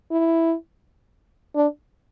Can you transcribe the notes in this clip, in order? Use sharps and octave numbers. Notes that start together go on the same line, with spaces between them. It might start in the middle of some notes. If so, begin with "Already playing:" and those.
E4
D4